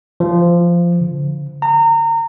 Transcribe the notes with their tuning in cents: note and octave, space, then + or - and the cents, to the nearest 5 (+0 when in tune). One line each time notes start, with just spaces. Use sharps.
F3 -15
D3 -25
A#5 -30